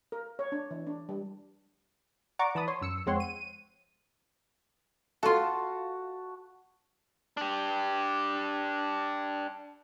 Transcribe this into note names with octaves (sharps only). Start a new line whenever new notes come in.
A#4
C#5
D4
E3
D4
G3
D5 F#5 A#5 C#6 D6
E3 A5 B5 D#6
C#5 C6
F#2 E6 C#7
F2 G#3 C4 C#5 F#5 C6
D#7
F4 F#4 A4 A5
D4 G4